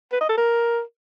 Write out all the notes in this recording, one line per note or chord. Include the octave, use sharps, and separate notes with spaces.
B4
D#5
A4
A#4